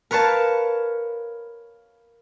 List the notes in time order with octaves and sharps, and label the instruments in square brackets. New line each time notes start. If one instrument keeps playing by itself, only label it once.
[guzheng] A#4 B4 C#5 F5 A5